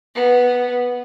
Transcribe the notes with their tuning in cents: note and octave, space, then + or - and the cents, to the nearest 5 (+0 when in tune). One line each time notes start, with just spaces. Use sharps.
B3 -5